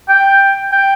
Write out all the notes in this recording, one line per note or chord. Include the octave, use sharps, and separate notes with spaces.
G5
G5